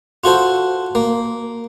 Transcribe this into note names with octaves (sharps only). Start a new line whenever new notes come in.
F4 F#4 A4 C5
A#3